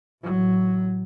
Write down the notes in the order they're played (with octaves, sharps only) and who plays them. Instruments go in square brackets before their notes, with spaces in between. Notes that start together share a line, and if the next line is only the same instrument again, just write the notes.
[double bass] A1 F#3